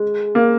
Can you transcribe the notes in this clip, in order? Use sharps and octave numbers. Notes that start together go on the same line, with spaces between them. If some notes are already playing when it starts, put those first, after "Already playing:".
Already playing: G#3
A#3